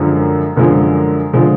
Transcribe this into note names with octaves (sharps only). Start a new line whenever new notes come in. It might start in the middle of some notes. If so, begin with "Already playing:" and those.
Already playing: F#2 D3 F3 G#3
F#2 D3 F3 G#3
D3 F3 G#3